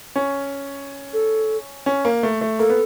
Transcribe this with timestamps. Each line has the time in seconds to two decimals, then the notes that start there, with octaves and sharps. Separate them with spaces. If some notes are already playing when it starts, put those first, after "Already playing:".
0.16 C#4
1.13 A4
1.86 C#4
2.05 A#3
2.23 A3
2.41 A3
2.59 A#3 A4
2.70 B3